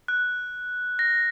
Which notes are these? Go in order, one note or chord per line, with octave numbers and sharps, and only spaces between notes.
F#6
A#6